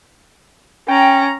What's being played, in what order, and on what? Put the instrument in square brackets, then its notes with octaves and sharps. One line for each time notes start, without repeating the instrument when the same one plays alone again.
[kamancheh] C#4 A#5 [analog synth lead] G5